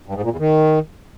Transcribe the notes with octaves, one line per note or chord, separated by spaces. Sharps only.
G2
G#2
A#2
E2
D#3